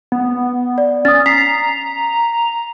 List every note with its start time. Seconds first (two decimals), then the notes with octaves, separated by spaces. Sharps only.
0.12 B3
0.78 D5
1.05 C#4 D#6 A6
1.26 A#5 B6 C7